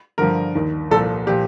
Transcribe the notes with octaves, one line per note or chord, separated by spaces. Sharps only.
G2 D3 F3 A#4
D#2 D#3
C2 A#2 F3 A4
A#2 F3 G4